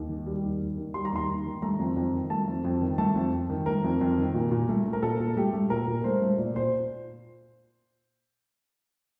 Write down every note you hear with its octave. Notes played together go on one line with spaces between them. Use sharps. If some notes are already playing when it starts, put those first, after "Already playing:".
Already playing: D#2
D#3
G3
D#2
D#2
D#3
G3 C6
A#5
D#2 C6
D#2
D#3
A3 A#5
F2
F2
D#3
A3 A5
F2
F2
D#3
A3 A5
F2
F2
D#3
A3 A#4
F2
F2
D#3
A#2
A#2
A3
A3
A#4
A#2 A4
A#2
A3 G4
A3
A#2 A#4
A#2
A3 C5
A3
A#2 D5
A#2 C5